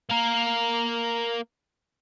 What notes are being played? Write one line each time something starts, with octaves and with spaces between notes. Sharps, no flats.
A#3 A#4